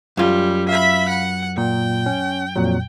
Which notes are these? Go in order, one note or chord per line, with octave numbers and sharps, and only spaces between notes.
F#2 G3 F4
E5 F5 B5
F#5
A#2 G5
C#4
F2 A#2 F#3